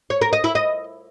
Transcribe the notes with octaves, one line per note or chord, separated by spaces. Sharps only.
C#5
A#4
D#5
E4
D#5